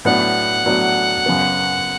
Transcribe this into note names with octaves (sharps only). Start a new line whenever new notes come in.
A2 F#3 B3 D4 F#5
A2 F#3 B3 D4
F#2 C#3 F#3 B3 F#4